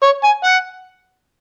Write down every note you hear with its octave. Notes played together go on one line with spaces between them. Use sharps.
C#5
G#5
F#5